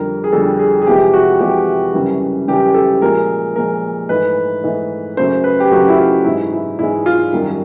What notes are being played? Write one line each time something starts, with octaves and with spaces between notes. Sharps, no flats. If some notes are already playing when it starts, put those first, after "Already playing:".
Already playing: F2 D3 G3 A#4
G#4
F2 D3 G3 A4
G#4
G#4
F2 C3 E3 G#3 G4
F#4
F2 C3 E3 G#3 G4
F#2 C#3 E3 G3
F#2 C#3 E3 G3 G4
A4
A#2 F3 G#3 A#4
A#2 F3 G#3 A#4
G#2 E3 A3 B4
G#2 E3 A3
F#2 C#3 F#3 A3 C5
B4
G4
F#2 C#3 F#3 A3 F#4
E4
F4
G#2 E3 G#3 E4
E4
G#2 E3 G#3 E4
F4
F#2 D#3 G3